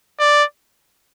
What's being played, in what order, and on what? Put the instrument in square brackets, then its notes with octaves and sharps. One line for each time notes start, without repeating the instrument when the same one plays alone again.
[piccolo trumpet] D5